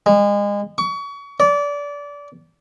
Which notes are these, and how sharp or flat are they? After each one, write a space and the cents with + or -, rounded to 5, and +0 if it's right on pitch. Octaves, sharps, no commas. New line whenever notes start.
G#3 -30
C#6 +30
D5 -25